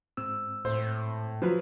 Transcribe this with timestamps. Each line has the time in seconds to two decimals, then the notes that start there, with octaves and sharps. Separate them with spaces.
0.17 G#2 C4 E6
0.65 A2 C5
1.42 F3 F#3 B4